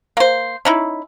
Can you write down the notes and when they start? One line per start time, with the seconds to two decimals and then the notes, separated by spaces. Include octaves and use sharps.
0.17 A#3 C5
0.65 C#4 D#4 E4